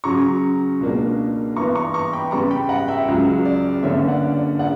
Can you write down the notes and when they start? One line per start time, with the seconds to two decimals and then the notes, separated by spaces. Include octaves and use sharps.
0.04 C#3 F#3 C#4 A#5 C#6
0.81 C#2 B2 A#3 D4
1.56 G2 E3 B3 A#5 C#6
1.75 A#5 C#6
1.94 A#5 C#6
2.13 G5 B5
2.31 C#3 G3 B3 A#5 C#6
2.51 G5 B5
2.69 F#5 A#5
2.88 E5 G5
3.08 C#2 C#3 F#3
3.45 D5
3.83 G2 D3 A#3 C#4 C#5 E5
4.08 D5 F#5
4.34 D5
4.59 C#3 D5 F#5